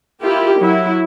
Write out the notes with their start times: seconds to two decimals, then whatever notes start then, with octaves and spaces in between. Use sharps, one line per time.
0.23 E4 F4 G4 A#4
0.60 F#3 E4